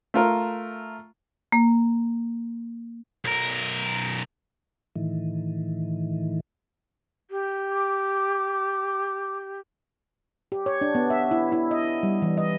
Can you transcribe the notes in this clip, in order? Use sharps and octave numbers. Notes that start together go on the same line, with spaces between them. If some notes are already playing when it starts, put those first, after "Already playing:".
A3 F4 A#4
A#3
B1 A#4
A2 D#3 E3
G4
D6
G4
C#5
D4
B3
E5
E4
E4
D#5
G3
E3
D#5